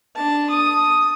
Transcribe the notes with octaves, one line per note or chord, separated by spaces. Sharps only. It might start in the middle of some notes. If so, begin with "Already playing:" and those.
D4 A5
D#6